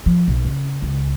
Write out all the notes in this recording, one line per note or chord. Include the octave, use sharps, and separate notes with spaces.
F3
B1
C#3
C#2